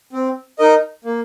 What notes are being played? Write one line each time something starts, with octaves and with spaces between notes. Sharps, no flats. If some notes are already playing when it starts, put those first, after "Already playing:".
C4
D#4 A#4 D#5
A#3